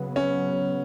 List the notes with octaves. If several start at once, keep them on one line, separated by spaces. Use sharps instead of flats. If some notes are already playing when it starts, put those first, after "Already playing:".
Already playing: C#3 F#3 B3
C#4